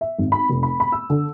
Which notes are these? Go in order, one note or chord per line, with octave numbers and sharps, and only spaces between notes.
E5
G#1
B5
F1
B5
B5
E6
D3